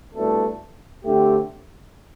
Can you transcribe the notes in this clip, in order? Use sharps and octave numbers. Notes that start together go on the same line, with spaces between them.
C2 B2 A3 D4 A4
D3 A3 C4 G4